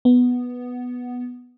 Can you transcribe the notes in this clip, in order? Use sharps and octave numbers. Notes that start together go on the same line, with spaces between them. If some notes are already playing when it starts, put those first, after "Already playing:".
B3